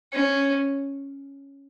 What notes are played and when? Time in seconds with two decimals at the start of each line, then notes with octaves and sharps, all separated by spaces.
0.13 C#4